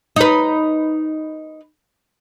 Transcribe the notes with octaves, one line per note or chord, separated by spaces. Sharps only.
D#4 B4